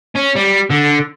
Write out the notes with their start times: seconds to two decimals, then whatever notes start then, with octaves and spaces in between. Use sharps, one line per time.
0.15 C#4
0.35 G3
0.70 D3